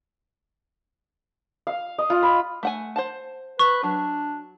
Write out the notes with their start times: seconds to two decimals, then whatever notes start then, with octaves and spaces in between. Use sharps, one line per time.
1.67 F5
1.98 D#5
2.10 F4
2.23 B5
2.63 A3 F#5 G#5
2.96 C5 F#5 A5
3.59 B4 C#6
3.84 F#3 D4